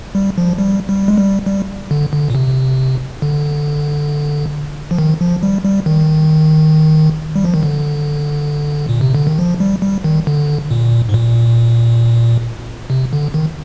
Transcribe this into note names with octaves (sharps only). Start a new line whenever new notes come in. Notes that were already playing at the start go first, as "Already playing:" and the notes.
G3
F3
G3
G3
G#3
G3
G3
D3
D3
A#2
C3
D3
F3
D#3
F3
G3
G3
D#3
G3
F3
D#3
D3
A#2
C3
D3
D#3
F3
G3
G3
D#3
D3
A#2
G#2
A#2
C3
D3
D#3